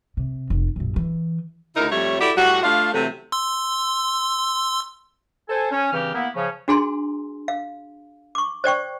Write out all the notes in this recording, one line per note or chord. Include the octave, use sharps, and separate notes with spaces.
C3
F1
A#1 F#2
E3
D2 C#3 D#4 E4 A#4
F2 G3 A3 C#5
E4 F#4 G4 A4 D5
A2 G3 F#4
A3 D4 F4 F5
C3 E3 F#3 A3
C6 E6
A4 C5 G#5
C#4
G2 C#3 E3 C4 G4 F6
A#3 B3 E4
C#3 F3 C#4
D4 F#4 G#4 G#5 A#5 C6
F5
C#6 D6
C5 D5 G5 C#6